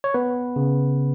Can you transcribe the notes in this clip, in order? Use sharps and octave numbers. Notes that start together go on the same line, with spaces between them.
C#5
B3 B4
C#3